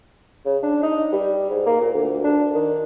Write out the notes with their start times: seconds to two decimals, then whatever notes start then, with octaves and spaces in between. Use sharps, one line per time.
0.45 C#3
0.63 D4
0.83 D#4
1.12 G3
1.50 G#2
1.66 A#3
1.80 A#2
1.94 D2
2.24 D4
2.54 D#3